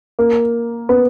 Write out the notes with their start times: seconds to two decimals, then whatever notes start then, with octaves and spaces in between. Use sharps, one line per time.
0.19 A#3
0.89 B3